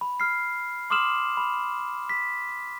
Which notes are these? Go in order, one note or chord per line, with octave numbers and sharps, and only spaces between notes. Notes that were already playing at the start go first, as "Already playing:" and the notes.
B5
F6 C7
C6 D6 D#6 F6 E7 F#7
B5
B6